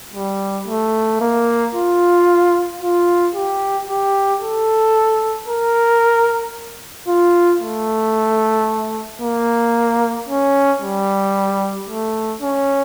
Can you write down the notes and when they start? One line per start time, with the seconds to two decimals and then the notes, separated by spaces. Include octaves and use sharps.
0.14 G3
0.68 A3
1.21 A#3
1.75 F4
2.81 F4
3.35 G4
3.88 G4
4.41 A4
5.47 A#4
7.08 F4
7.61 A3
9.21 A#3
10.28 C#4
10.81 G3
11.88 A3
12.41 C#4